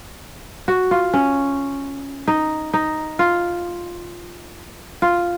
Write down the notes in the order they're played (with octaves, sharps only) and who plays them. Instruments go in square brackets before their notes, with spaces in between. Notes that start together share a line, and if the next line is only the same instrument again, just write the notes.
[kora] F#4
F4
C#4
D#4
D#4
F4
F4